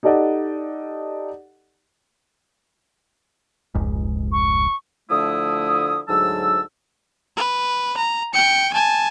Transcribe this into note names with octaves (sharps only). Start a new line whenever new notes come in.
D#4 G4 A4 D5 D#5 F#5
F1 C#2 G#2
C#6
D3 F3 A3 E4 D#6
D2 G#2 F#3 A5 E6
B4
A#5
G5 C#7
G#5 A5